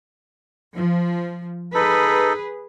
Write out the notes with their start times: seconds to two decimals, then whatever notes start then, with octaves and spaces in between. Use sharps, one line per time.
0.76 F3
1.74 D#4 G#4 A4 B4